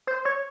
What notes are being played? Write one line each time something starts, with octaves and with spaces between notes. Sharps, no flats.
C5
C#5